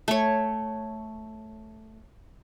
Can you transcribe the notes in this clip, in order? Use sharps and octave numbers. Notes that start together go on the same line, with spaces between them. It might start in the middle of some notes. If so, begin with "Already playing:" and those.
A3 C#5